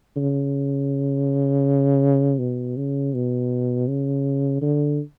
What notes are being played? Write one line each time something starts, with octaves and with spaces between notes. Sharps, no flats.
C#3
B2
C#3
B2
C#3
D3